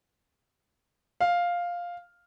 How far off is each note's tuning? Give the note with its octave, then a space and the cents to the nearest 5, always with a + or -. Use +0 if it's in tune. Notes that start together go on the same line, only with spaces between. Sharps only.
F5 +5